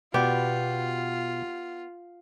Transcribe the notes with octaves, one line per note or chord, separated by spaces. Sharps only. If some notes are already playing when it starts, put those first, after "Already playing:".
B2 B3 F4 G4 D5